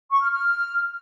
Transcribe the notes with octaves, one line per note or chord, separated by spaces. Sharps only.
C#6
F6
F6